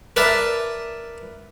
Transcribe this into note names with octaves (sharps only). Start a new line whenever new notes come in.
A#4 B4 D5 E5 A5